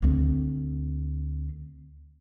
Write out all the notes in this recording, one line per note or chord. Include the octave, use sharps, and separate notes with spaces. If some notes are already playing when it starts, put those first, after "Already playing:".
D2 C4